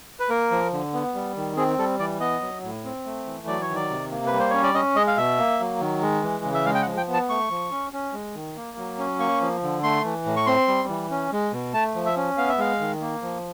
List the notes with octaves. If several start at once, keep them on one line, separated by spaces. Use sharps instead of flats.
B4
A#3 A#4
F3
D3
B3
G3
D#3
C4 G#4
G3 A4
E3 D5
B3 D#5
F#3
A2
C4
A3
E3
F#3 D5
C#5
D#3
D5
C3
A#3
B4
G3
C5
C#4 C#5
D5
C#4 D#5
G#3 D#5
F5
B2 E5
A#3
F#3
D#3
G#3
E3
C#3
E5
G#3 F5
G5
F#5
F3
G5
B3
A5
A3 C#6
F3
C#4
C#4
G#3
D#3
A#3
F#3
C#4
A#3 C#6
F3
D3
A3 C6
E3
A2
C#6
C4 C6
G3
E3
C#4
G#3
B2
A3 A5
F3
E5
C#4
B3 F5
E5
G#3 F5
D#3
A#3
F3